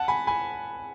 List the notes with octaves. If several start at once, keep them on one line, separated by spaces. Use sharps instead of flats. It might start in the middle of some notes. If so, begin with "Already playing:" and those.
Already playing: F#5 A5
G#5 B5
G#5 B5